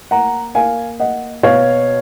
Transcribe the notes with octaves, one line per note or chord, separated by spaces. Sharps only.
A#3 F#5 A#5
A#3 F5 G#5
A#3 D#5 F#5
B2 C#5 F5